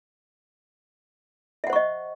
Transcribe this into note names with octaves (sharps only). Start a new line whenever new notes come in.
C5 D#5 E5 F#5 C#6